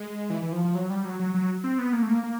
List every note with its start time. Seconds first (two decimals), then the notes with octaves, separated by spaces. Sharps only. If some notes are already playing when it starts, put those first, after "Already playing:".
Already playing: G#3
0.30 E3
0.42 E3
0.52 F3
0.64 F3
0.75 F#3
0.90 G3
1.05 F#3
1.20 F#3
1.34 F#3
1.64 C4
1.79 B3
1.93 A#3
2.02 A3
2.08 A#3
2.23 A#3